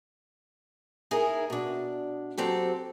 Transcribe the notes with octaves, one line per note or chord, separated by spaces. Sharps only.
D#4 E4 G#4 A#4
B2 D4
F#3 C4 G4 A4